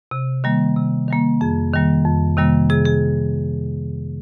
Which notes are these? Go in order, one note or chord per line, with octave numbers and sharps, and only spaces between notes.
C3
D#3 G3 A#3
C3
D#3 G3 A#3
F2 G#4
C3 D#3 G3 A#3
F2
C3 D#3 G3 A#3
C3 G#4
G#4